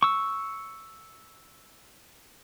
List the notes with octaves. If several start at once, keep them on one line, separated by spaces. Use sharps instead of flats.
C#6 E6